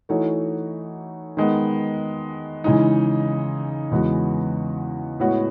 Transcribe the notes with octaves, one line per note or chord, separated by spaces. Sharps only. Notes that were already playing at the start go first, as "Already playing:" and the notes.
E3 A3 D#4 F#4 C#5
D#3 G#3 B3
C#3 E3 G#3 D#4
E2 C#3 G#3 B3 F#4
A2 G#3 B3 F#4 C#5